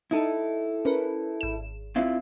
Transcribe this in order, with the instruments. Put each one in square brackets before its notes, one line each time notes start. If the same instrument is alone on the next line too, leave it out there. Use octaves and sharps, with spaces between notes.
[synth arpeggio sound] D#4 D#5 [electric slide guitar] E4 A4
[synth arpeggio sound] C#4 A#4 B4
G#1 E7
[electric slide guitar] C4 E4 F4